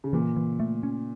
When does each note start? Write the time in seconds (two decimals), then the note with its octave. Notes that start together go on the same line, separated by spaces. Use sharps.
0.04 C#3
0.13 A#2 E3
0.36 E3
0.60 A3
0.83 C#4